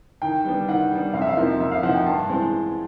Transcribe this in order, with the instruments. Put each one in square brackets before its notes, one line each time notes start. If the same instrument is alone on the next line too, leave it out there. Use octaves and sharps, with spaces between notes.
[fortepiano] D#3 [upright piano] G5
[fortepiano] G3 B3 D4
[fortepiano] D#3 [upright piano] F#5
[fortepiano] G3 B3 D4
[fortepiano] F2 [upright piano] F5
[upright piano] E5
F5
[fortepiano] C3 F3 A#3 D#4
[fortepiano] F2 [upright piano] E5
[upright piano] F5
[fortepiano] C3 F3 A#3 D#4 [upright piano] F#5
[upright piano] G5
[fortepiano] G2 [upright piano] A5
[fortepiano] E3 G#3 C4